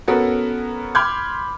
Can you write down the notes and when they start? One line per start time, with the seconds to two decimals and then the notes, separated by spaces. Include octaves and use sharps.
0.08 B3 C#4 F#4 A4 A#4
0.95 B5 C6 D6 F6 G6 G#6